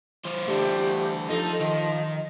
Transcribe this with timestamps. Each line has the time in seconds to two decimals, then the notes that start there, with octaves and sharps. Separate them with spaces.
0.25 E3 C5
0.48 A3 D4 G4
1.30 F3 D#4 A4
1.61 D#3 D#5